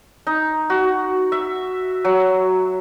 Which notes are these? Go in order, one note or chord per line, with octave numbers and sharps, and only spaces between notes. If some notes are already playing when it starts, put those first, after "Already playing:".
D#4
F#4
E5
F#3